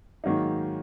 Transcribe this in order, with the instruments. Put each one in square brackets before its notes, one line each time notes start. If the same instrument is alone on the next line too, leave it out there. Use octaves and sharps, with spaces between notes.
[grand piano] G#2 D#3 F#3 A#3 D#4